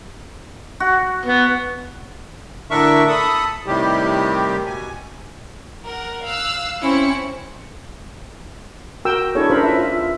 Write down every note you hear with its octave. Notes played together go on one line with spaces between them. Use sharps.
F#4
B3
A2 D3 D4 A#4 E5 C#6
A4 A5 B5 D#6
A2 C3 D#3 G3 G4
B2 G#5
A#4 F#5
F5 E6 F#6
C4 C#4 E4 C#7
F#4 A#4 G5 E6
D4 E4 G#4 A4 C#5
C#4 D4 F4 A#4 C5 B5
B4 E5
F4 E5
E5